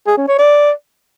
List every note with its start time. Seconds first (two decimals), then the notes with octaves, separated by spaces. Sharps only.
0.07 G#4
0.17 C#4
0.28 C#5
0.39 D5